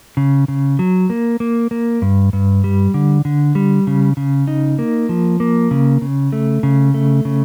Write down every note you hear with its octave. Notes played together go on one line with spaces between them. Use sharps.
C#3
C#3
F#3
A#3
A#3
A#3
G2
G2
G3
D3
D3
G3
C#3
C#3
D#4
A#3
F3
A#3
C#3
C#3
A3
C#3
A3
C#3